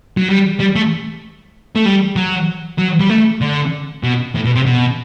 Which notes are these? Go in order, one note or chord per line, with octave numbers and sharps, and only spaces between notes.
F#3
G3
G3
A3
A3
G3
F#3
F#3
G3
A3
D3
B2
A2
B2
C3
B2